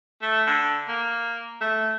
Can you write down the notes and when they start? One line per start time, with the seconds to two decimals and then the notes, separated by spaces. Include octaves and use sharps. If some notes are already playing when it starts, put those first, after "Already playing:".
0.22 A3
0.47 D3
0.88 A#3
1.61 A3